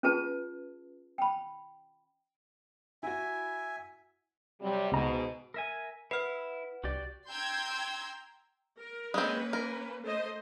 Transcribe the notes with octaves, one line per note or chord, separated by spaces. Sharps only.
C#4 F4 G#4 B4 A5
G5 B5
E4 F#4 E5 G#5
C3 F#3 G3
C#2 G#2 B2 A#5
A#4 E5 G#5
E4 B4 F#5 F6
C2 F#4 G4 D5
G5 A#5 C6 E6 G6 G#6
A#4
G#3 A#3 C4 C#4 B4
A#4
A3 C5 D#5